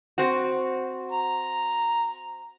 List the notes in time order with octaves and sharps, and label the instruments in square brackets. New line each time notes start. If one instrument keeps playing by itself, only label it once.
[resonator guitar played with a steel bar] C4 F#4
[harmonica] A#5